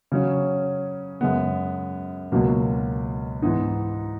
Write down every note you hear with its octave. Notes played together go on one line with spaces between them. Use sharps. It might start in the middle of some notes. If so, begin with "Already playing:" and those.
C#3 F#3 C#4
F#2 C#3 G#3 B3
C#2 B2 F#3 A#3
G#2 E3 B3 D#4